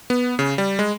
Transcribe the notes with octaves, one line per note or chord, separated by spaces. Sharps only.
B3
C#3
G3
G#3